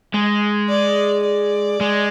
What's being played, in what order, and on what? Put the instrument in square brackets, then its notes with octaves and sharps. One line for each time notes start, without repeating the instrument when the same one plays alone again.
[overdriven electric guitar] G#3
[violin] D5
D5
[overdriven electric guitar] G#3